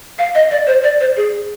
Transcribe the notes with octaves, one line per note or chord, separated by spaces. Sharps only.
F5
D#5
D5
C5
D5
C5
G#4